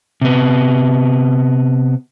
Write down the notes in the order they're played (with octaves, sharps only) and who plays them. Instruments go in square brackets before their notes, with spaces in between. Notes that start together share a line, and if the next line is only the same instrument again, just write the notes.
[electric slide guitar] C3 B3